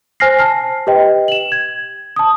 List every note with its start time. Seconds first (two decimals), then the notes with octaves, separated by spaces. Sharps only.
0.20 C5 G#5 F6 A#6 C7
0.39 A5 F6 C7
0.87 G4 B4 D#5 G5
1.28 E7 F#7
1.52 G#6
2.16 A5 D#6